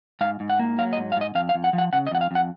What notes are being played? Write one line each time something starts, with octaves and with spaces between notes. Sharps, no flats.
G#2 F5
G#2
F#5
A#3
F#3 F5
D#5
G#2
F5
G#2 D#5
F2 F5
F5
F2
F#5
F3
F#5
C#3 F#5
D#5
F2 F#5
F5
F2 F#5